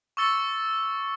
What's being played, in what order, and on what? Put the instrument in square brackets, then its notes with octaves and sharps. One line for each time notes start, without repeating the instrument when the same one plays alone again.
[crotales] C#6 D6 E6 A6 C#7 G7